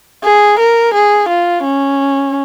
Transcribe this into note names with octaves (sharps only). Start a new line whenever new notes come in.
G#4
A#4
G#4
F4
C#4